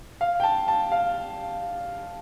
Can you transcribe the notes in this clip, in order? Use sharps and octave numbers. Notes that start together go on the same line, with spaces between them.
F5
G5
A5
A5
F5